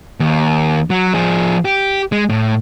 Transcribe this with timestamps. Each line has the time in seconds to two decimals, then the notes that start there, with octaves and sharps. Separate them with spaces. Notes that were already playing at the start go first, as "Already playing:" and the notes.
0.20 D#2
0.90 F#3
1.14 F3 G#4
1.65 G4
2.12 G#3
2.29 A2